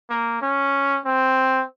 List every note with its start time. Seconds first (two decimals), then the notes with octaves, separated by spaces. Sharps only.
0.10 A#3
0.42 C#4
1.06 C4